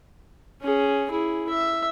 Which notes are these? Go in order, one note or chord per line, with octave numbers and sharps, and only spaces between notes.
C#4 G#4
E4 G#4
E5